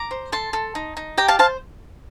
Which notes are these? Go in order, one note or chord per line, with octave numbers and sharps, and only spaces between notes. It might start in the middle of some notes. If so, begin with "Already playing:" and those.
Already playing: A#5 D6
C5
A4 A5 C6
A4
D#4
D#4
G4 G5 A#5
F5 A5
C5 F5 A5